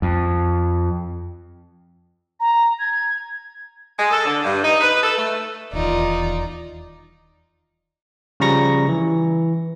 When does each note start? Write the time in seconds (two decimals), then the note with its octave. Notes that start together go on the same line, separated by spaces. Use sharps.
0.02 F2
2.40 A#5
2.79 G#6
3.97 G#3
4.11 A4
4.25 D3
4.43 G2
4.64 D#4
4.81 B4
5.02 A4
5.17 A3
5.73 D#1 E2 D#3 D#4 F4 D5
8.40 C#3 F3 G3 A#5 C#6 A#6
8.89 E3